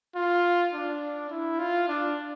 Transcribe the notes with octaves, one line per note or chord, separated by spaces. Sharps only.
F4
D4
E4
F4
D4